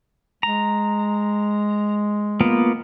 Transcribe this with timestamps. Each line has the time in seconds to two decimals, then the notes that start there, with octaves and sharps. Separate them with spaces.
0.43 G#3 A#5
2.41 A#3 B3 F4